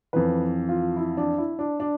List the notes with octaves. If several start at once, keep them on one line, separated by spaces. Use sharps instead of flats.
F2 E3 B4
F4
E4
D4
E4
D4
D4